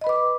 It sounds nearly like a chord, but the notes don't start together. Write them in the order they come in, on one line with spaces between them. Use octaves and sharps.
D#5 B5 B4 D6